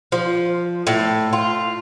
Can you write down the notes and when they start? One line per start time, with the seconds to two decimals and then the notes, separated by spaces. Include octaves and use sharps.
0.12 F3
0.87 A2
1.33 F4